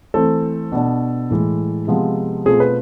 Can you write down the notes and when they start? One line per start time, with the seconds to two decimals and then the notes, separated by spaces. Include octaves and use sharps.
0.14 E3 A3 C4 A4
0.72 B2 B3 D4
1.30 A2 E3 G#3
1.87 C3 F3 G#3 B3
2.45 B2 A3 C4 F4 G#4
2.60 B4